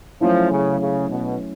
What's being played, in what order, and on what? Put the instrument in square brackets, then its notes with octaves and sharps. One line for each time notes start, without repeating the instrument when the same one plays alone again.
[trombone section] F3 [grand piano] F#3 A3 C#4 E4
[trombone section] C#3
C#3
B2